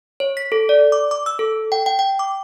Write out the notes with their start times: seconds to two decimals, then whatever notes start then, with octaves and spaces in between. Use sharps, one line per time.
0.20 C#5
0.37 B6
0.52 A4
0.69 D5
0.92 D6
1.11 D6
1.26 E6
1.39 A4
1.72 G5
1.86 G5
1.99 G5
2.19 D6